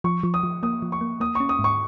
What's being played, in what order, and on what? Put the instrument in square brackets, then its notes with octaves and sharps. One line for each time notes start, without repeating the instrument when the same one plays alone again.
[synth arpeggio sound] F3 [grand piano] C#6
[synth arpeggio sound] F3
[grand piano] D#6
[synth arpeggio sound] F3
[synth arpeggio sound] A#3 [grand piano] D#6
[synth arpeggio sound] F3
[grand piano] C#6
[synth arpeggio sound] A#3
[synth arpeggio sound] A#3 [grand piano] D#6
[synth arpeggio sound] C#4 [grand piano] C#6
[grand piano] D#6
[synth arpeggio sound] G#2
[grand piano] C#6